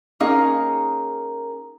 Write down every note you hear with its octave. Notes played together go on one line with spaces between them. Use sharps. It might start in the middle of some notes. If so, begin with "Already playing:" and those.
A#3 C#4 D#4 G#4 A#4 F5